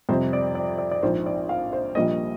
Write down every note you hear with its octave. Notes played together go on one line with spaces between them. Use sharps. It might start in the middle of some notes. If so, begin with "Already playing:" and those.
F2 C3 G3 C5
D5
D5
D5
D5
A#1 G#2 F3 C5
D5
F5
C5
A#1 A#2 G3 A#3 D#5